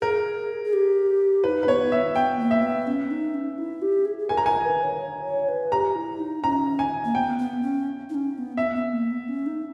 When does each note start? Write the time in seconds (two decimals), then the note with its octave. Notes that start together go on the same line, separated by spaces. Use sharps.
0.01 G#4 A#4
0.64 G#4
0.73 G4
1.44 E4 B4
1.48 D#4
1.63 B4
1.68 B3 C#5
1.92 E5
2.15 B3 G5
2.39 A#3
2.51 E5
2.63 B3
2.87 C#4
3.11 D#4
3.34 C#4
3.58 E4
3.82 G4
4.05 G#4
4.18 G#4
4.29 A#4 G#5
4.37 A#5
4.46 A#4 G#5
4.65 B4
4.83 C#5
5.01 C#5
5.25 C#5
5.49 B4
5.72 G4 A#5
5.96 E4
6.20 D#4
6.43 C#4 A#5
6.79 G#5
7.05 A#3
7.15 B3 G5
7.39 B3
7.62 C#4
8.10 D#4
8.15 C#4
8.33 C#4
8.38 B3
8.57 B3 E5
8.75 B3
8.93 A#3
9.11 B3
9.28 C#4
9.46 D#4